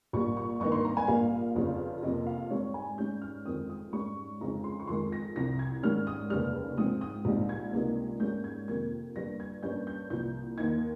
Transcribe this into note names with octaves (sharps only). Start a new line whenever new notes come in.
A#1 A#2 G3 C#6
C#6
G#1 G2 D#3 A#3 D#4 C#6
C6
A#5
G#5
A#1 A#2 G3 A#3 F5
G1 F2 C#3 G3 C#4
F2 C3 F3 A#3 D#5
F5
G#2 G3 C4 C#5
G#5
G#2 G3 C#4 G6
F6
G1 F2 D#3 G#3 C4 D#6
D#6
G#2 G3 C#4 C#6
F2 C#3 G#3 C4 D#4 A#5
C6
C#6
F2 D#3 G#3 C6
A#6
C2 C3 F3 A#6
G#6
G#2 D#3 G3 C#4 F6
D#6
F1 D#2 C#3 G3 F6
G#2 F3 C4 D#6
D#6
A#1 G#2 G3 C4 D#4
G#6
C#2 C3 G3 A#3 D#4
G#2 G3 A#3 C#4 G6
G#6
F2 C3 D#3 A#3 G#6
G1 G2 G3 A#3 A#6
G#6
G2 G3 A#3 C#4 G6
G6
C2 A#2 F3 G6
D#2 D#3 A#3 D#4 G#6